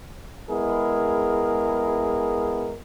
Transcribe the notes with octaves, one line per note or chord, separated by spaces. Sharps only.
G#3 B3 E4 G#4 A#4